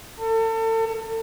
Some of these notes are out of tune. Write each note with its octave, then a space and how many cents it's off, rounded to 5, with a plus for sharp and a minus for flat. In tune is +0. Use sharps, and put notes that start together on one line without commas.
A4 +35